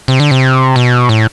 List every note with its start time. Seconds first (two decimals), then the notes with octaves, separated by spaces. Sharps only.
0.08 C3
0.20 D3
0.31 C3
0.76 B2
1.09 A2